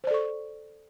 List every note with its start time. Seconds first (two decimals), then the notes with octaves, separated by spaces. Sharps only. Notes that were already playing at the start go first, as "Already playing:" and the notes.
0.04 C5
0.07 D5
0.11 A4
0.14 C#6